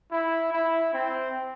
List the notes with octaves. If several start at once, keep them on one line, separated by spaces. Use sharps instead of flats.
E4
E4
C4